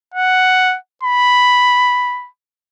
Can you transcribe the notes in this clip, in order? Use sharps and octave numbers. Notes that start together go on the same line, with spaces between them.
F#5
B5